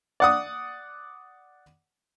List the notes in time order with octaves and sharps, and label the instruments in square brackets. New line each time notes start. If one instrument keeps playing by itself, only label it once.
[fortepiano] D5 F#5 D#6